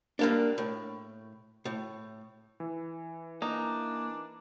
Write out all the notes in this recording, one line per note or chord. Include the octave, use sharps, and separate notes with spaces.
G2 A#3 D4
A2
A2
E3
A#3 D4 D#4